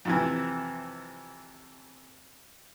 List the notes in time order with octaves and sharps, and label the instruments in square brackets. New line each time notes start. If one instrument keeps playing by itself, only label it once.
[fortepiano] F2 C3 E3